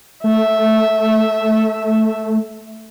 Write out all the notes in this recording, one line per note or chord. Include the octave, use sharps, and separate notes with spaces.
A3 E5